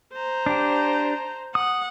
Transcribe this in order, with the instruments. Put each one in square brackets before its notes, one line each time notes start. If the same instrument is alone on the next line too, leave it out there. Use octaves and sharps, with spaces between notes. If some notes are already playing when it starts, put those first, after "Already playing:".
[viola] C5 A#5
[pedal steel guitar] D4 G4
[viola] F#5 [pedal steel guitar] D#6